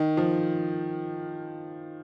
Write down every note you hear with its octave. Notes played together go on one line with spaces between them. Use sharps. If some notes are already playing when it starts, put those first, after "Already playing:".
Already playing: D#3
F3